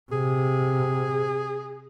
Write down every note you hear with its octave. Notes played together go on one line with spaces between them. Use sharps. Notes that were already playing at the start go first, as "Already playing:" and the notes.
C3 G#4